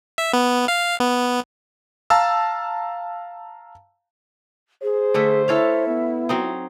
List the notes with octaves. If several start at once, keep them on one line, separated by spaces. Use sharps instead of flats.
E5
B3
F5
B3
F5 A5 A#5 E6
G#4 C5
D3 A3 E5
E4 A4 C#5 F5
B3
F#3 C4 D#4